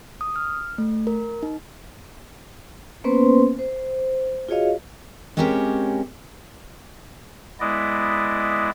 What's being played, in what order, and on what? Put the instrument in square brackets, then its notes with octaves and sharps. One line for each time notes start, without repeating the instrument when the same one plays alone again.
[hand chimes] D#6
F6
A3
A#4
D#4
[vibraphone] A#3 B3 C#4 B4 C5 C6
C5
F4 F#4 G#4 C#5 D#5 F5
[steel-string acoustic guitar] G#3 C4 C#4 G4 A#4 C#5
[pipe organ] G#3 B3 E4 D5 D#5